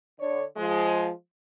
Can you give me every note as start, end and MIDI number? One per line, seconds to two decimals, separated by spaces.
0.19 0.44 50
0.19 0.44 73
0.19 0.44 74
0.57 1.10 53
0.57 1.10 56